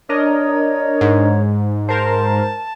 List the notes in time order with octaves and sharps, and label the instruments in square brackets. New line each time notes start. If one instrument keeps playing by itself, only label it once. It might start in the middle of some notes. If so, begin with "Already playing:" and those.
[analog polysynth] D4 A#4 D#5 [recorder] C#5
[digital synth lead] G#2
[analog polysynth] A#4 C5 [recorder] A5